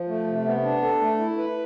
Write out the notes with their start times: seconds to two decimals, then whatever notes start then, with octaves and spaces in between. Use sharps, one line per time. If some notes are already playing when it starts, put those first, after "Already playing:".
Already playing: F3
0.08 A3
0.26 C3
0.45 B3
0.63 D4
0.82 A4
1.01 A3
1.19 E4
1.38 B4